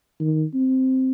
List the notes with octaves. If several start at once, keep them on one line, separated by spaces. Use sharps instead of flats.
D#3
C4